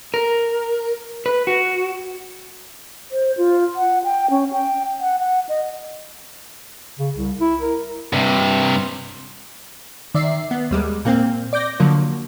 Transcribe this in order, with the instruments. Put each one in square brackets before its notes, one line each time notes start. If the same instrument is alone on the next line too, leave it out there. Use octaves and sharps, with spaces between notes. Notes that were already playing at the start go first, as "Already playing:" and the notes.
[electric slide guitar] A#4
B4
F#4
[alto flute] C5
F4
F#5
G5
C#4
G5
F#5
F#5
D#5
[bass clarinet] C#3
C2
E4
A#4
[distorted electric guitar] G2 C3
[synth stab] D#3 D5 E5 C7
B3
D#2 G3 G#3
A#2 A#3 C4
D5 D6 G6 A#6
D3 F3 F#3 A#3